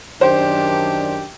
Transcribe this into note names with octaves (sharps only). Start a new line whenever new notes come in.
F#2 D#3 D4 G4 C5